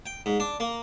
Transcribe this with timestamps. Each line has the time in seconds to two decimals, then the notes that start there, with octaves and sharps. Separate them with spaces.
0.06 G5
0.26 G#2
0.40 D4
0.60 A#3